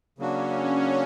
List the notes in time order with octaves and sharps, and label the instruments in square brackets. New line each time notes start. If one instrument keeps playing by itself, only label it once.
[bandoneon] C#3 F#3 A#3 D4 F#4 [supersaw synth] C#4